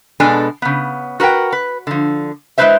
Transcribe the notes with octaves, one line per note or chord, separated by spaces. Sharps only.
B2 G#3 B3 D4 A4 G#5
C#3 B3
F#4 A#4 B4 F#5 G5
B4
D3 F3
G#3 A#3 E4 B4 C5 E5